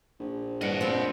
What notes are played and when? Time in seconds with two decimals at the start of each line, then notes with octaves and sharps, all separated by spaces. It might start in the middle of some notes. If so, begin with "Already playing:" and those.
0.20 A#1
0.61 G2 D#5 F#5
0.81 F3 C4